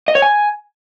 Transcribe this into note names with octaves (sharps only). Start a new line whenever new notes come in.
D#5
C#5
G#5